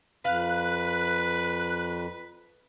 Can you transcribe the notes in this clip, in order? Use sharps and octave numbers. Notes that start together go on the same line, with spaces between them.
F2 B4 F5 F#6